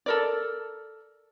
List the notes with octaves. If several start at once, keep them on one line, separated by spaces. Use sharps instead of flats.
A4 A#4 D5